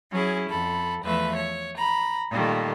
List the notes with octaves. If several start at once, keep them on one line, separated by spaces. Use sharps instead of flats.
F#3 C#4 E4 G#4
F2 A4 B5
E2 F3 A3 B4 E5
C#5
A#5 B5
A#2 D#3 G3 A3 A#3